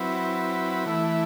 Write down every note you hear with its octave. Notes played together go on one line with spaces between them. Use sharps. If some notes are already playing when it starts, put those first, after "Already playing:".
Already playing: F#3 C4 E4 B4
E3 A3 E4